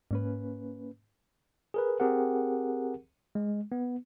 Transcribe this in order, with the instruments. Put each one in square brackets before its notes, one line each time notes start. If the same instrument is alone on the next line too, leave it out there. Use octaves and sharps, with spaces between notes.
[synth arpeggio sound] G#2 [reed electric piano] A#3 C#4 B4
[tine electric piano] G#4 A#4 B4
C4 G4 G#4 A#4 F#5
G#3
B3